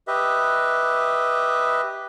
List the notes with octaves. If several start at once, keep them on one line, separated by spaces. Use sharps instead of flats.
G4 B4 D#5 E5